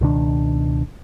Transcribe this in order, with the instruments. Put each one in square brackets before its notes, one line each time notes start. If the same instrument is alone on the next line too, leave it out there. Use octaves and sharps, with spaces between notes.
[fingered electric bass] C#2 B2 D#3 D4